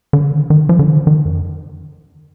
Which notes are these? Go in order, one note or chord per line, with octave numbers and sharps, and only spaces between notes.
D3
D#3
D#3
F3
D3
D#3
D#3
F2